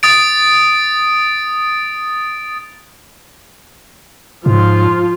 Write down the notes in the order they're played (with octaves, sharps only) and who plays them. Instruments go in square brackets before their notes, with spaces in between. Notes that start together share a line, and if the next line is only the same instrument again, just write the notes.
[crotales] D#6 A6 D7
[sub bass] G#2 [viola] F3 F4